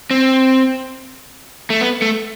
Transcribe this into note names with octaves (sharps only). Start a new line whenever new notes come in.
C4
A3
B3
A3